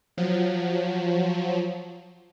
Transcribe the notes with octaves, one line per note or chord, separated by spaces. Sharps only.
F3 F#3